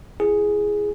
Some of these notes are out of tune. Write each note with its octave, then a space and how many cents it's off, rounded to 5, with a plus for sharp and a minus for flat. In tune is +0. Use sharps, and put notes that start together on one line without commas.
E4 +35 G#4 +0